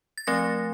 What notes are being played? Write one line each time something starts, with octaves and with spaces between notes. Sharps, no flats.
A6
F3 A3 C4 A#6